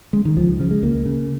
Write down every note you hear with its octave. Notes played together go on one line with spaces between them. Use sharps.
C#3 G#3
D#3
C#2 F3
C#3 F3
G#3
C#2 A#3
C#3